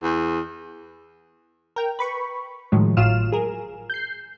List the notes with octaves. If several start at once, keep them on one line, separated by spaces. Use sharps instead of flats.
E2
A#4 G5
B4 B5 C#6
A2 D#3 F3 F#3 G#3
G#1 A2 F#3 F4 F6 E7
G#4 A#4
G6 C7